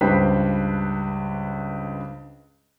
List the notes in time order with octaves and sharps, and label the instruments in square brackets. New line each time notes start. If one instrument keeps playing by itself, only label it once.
[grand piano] C#2 G2 B4 C5 G5 B6